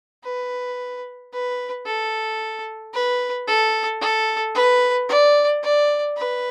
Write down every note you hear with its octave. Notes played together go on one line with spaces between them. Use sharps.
B4
B4
A4
B4
A4
A4
B4
D5
D5
B4